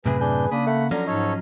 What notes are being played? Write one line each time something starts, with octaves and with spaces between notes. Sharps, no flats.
F#2 A2 C3 G#4 B4
D4 G#4 G6
C#3 A#3 D4 B5 D#6
A3 F#5 B5
D3 F3 F#3 C#4 A#5
G#2 D#4 A4 C#5